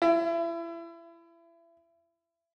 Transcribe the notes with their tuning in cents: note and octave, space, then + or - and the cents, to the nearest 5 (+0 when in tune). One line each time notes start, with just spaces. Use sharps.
E4 +30